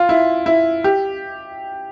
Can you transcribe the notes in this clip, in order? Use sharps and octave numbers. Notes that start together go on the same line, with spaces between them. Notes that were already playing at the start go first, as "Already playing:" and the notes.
Already playing: F4
E4
E4
G4